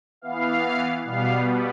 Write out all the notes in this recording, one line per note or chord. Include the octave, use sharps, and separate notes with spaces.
E3 B3 F5
B2 G3 B3 F5